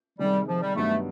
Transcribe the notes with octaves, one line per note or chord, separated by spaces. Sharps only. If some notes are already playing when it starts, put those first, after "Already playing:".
C3 D#3 G3 G#3
F3
G3
G2 D#3 F#3 A3 B3